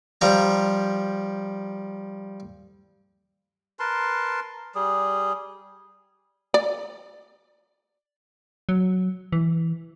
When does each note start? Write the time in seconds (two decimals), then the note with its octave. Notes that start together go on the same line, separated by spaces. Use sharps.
0.21 F3 G3 A#5
3.79 A#4 B4 A5 C6
4.75 G3 G#4
6.54 D5
8.69 F#3
9.32 E3